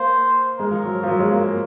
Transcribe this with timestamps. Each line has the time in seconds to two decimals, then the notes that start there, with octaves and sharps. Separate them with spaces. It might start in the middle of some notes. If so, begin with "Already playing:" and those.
Already playing: A#3 C5
0.59 G#3 A#4
0.71 F3
0.84 F#3
1.03 F3
1.08 F#3
1.19 G#3
1.31 A#3
1.44 A#3